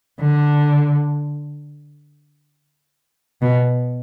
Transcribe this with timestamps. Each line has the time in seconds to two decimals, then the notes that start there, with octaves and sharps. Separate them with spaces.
0.20 D3
3.42 B2